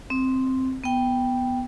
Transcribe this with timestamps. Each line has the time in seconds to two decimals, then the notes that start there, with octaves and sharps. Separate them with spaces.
0.10 C4
0.84 B3 G5